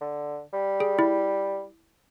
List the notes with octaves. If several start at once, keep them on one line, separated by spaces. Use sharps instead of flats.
D3
G3
G#4
E4